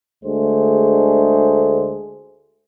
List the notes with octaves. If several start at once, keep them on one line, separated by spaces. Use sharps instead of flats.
D2 D3 G#3 A3 G#4 C5